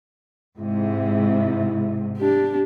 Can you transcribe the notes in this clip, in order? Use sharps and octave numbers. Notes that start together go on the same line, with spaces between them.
G#2 C3 E4
D4 G4